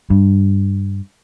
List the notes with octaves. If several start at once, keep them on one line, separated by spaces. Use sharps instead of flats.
G2